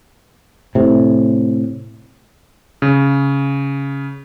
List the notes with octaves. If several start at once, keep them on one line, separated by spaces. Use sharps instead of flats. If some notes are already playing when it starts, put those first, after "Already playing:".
A2 C3
C#3